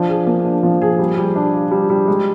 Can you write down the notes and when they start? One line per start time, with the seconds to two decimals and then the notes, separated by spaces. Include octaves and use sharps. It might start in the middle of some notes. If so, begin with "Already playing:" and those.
Already playing: F3 D4
0.08 G#4
0.27 A#3
0.45 D4
0.63 F3
0.82 G#4
0.99 G3
1.18 G3
1.36 D4
1.54 F4
1.71 G3
1.90 G3
2.08 G#3